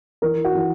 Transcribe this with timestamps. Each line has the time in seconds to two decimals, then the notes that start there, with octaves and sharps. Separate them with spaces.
0.22 E3 A#4
0.45 F#4
0.55 E3